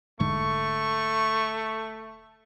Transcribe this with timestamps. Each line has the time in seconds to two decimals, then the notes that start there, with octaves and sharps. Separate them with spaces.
0.20 E1 G#2 D3 G#3 A3 C#6